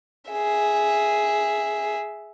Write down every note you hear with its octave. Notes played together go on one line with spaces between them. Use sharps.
G#4 E5